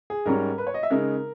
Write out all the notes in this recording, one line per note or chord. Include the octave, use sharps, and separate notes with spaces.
G#4
G#2 G3 C#4 A#4
B4
C#5
D#5
E5
C#3 G#3 D#4 A#4